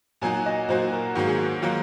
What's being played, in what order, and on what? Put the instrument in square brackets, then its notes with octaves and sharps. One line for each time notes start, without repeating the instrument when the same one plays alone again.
[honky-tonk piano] A#2 F#3 A#3 D#4 F#4 [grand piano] G#5
[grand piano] D#5
[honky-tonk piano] A#2 F#3 A#3 D#4 F#4 [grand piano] C5
[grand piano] A#4
[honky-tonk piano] G#2 D#3 F#3 A#3 [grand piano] F#4
[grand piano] G#4
F#4
[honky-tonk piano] D#3 F#3 A#3 [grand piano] F4